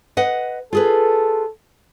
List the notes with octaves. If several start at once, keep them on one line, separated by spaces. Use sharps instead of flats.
B4 D#5 F#5
F4 G#4 A4 B4